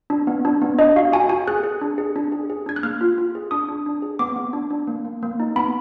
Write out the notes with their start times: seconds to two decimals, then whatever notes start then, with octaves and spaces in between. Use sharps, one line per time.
0.10 D4
0.27 B3
0.45 D4
0.62 B3
0.78 D4 D#5
0.96 F#4 F5
1.12 F#4 G#5
1.29 F#4 G#5
1.48 G#4 F#6
1.63 G#4
1.81 D4
1.98 G#4
2.16 D4
2.32 G#4
2.50 G#4
2.66 D4 G#6
2.76 F#6
2.83 A#3 F6
3.01 F4
3.18 F4
3.35 G#4
3.51 D4 D#6
3.68 D4
3.86 D4
4.02 G#4
4.19 B3 D6
4.36 B3
4.53 D4
4.70 D4
4.87 A#3
5.05 A#3
5.23 A#3
5.40 D#4
5.56 B3 B5